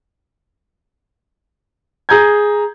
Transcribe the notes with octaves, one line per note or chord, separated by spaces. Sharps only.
G#4 A#5 G6 G#6